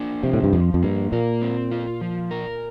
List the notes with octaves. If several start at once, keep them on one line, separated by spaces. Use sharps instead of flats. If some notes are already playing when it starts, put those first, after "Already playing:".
Already playing: A#3 D4
C3 F3
A2
G2
F2 F3
F2
G2 A#3
A#2 A#4
C4
F4
F3
A#4